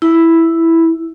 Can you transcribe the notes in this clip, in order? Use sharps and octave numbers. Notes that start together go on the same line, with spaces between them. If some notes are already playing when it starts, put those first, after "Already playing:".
E4